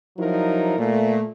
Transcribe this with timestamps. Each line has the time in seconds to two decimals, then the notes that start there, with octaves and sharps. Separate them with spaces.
0.17 F3 F#3 D#4 E4 A#4
0.78 A#2 A3